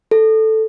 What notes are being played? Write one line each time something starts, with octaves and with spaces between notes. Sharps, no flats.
A4